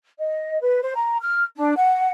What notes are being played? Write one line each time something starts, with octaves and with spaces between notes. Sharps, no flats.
D#5
B4
C5
A#5
F6
D4
F#5